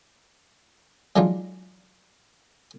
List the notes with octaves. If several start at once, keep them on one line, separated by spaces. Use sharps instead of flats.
F#3 G#3 D4 D#4 F4